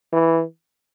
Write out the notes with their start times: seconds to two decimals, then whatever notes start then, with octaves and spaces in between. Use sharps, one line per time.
0.13 E3